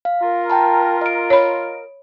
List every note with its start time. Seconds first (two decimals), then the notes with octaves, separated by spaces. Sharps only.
0.05 F5
0.22 F4 A#4
0.50 G5 A5 A#5
1.01 D#5 D7
1.30 C#5 B5